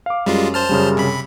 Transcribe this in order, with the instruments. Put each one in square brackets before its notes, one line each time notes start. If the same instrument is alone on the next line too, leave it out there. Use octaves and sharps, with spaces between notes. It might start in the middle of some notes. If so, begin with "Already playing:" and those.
[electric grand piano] F5 D6
[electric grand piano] F#2 [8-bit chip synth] G3 G#3 F4
[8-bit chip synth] C5 A5 F6
[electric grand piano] F#2 C#3 G3
[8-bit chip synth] C3 B5